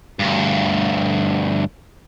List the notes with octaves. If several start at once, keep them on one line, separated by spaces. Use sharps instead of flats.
D2 G2